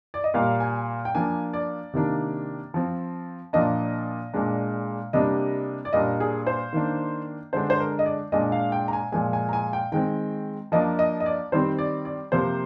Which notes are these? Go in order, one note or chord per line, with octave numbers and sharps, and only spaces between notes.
D5
D#5
A#2 G3 A#3 F5
G#5
G5
F3 A#3 D4 G#5
D5
C3 D#3 A#3 D4
F3 C4
A#2 F3 A#3 D4 D#5
A#2 G#3 D4
C3 G3 A#3 D4 D#5
D5
A#2 G3 A#3 D4 D#5
G#4
C5
D#3 A#3 D4
D3 G#3 D4 C5
C5
A#4
D#5
D5
A#2 G#3 D4 D#5
F5
G5
A#5
G#5
A#2 F3 G#3 G#5
G#5
A#5
G#5
G5
D#3 G#3 C4 G5
F3 A#3 D4 D#5
D#5
D#5
D5
D#3 G3 C4 C5
D5
D5
C3 F3 A#3 C5